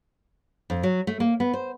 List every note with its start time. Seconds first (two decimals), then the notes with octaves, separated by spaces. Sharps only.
0.70 F2
0.83 F#3
1.07 A3
1.20 A#3
1.40 B3
1.54 C5